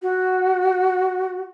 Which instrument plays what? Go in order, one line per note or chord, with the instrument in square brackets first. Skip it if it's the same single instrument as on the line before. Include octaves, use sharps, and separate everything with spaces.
[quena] F#4